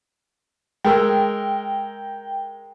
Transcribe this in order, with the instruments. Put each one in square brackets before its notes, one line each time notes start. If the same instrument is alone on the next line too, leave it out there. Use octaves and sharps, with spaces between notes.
[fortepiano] G#3 A#4 E6 [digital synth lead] G5